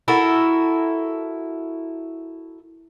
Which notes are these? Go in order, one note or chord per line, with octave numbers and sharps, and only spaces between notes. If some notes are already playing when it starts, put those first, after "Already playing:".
E4 F#4 A4 A#4